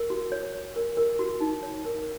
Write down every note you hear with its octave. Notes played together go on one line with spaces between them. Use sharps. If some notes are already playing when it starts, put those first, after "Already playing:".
Already playing: A#4
F#4
C#5
C#5
A#4
A#4
F#4
D#4
C#5
A#4